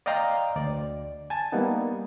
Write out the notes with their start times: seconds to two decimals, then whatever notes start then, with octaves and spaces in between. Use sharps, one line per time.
0.06 D5 D#5 F5 G5 A#5 C6
0.56 D2 D5
1.30 G#5 A5 A6
1.52 G3 A#3 B3 D#4